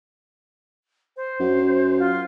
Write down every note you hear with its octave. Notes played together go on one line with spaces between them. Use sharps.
C5
F#2
F4